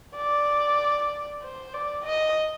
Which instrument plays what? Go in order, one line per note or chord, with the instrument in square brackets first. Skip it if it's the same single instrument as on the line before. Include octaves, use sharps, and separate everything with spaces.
[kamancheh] D5
C5
D5
D#5